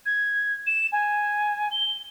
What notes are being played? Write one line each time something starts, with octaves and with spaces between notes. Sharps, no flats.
G#6
E7
G#5
G7